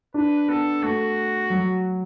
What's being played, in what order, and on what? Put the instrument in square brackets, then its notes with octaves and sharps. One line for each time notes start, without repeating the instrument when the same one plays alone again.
[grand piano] D4 [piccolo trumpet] B4
[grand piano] B3 [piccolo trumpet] A4
[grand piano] A3 [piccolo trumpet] F#4
[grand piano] F#3